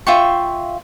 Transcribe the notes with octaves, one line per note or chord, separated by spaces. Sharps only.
F4 E5 G5 C#6